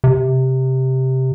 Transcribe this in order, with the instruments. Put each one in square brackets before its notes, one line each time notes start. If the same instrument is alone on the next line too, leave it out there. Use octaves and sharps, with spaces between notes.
[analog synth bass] C3